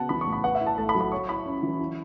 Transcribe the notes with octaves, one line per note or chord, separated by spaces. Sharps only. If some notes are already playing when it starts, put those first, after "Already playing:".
Already playing: C#3 B3 F#4 F#5 A5
E3 B5
A2 C#6
B5
B4 F#5
E5
E4
A5
A3 A5
B5
F#3
B5
C#5 C#6
E4 B5
C#4
E3
E4